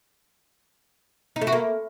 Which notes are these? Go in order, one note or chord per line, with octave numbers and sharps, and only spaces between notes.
D#4
A3
F#4
A#3